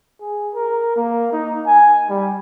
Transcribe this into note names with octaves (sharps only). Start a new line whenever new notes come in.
G#4
A#4
A#3
D#4
G#5
G3